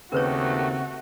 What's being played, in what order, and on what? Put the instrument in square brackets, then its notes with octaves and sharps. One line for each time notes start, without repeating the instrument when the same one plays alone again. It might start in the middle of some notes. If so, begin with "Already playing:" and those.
[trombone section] D#2 [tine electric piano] C#3 C4 [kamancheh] A3 F#4 [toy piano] A#4 B4 C#5